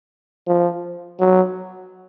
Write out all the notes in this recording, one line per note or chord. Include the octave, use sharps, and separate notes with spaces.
F3
F#3